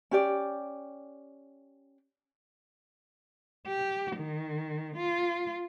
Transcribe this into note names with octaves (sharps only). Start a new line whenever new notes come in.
C#4 G4 D5
G4
D#3
F4